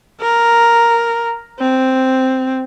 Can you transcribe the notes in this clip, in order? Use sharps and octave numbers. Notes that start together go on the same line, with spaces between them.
A#4
C4